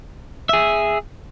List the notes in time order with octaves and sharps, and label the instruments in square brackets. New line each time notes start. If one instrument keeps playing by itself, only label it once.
[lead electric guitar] G#4 E5